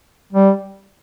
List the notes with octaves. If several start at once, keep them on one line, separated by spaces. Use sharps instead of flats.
G3